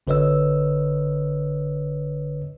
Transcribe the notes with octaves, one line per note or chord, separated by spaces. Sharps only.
G#1 D3 B4 C#5 D#5 E6